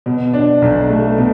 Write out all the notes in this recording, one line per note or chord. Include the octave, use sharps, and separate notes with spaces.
B2
D4
B1
A3
B2